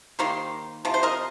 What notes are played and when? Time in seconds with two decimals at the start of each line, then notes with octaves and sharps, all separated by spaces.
0.19 D#3 A#3 G4 C5
0.85 C3 F3
0.94 C5
1.03 A#4 D#5